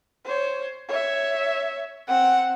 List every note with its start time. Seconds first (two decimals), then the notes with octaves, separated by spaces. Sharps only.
0.25 C5 C#5
0.89 C#5 E5
2.08 C4 F#5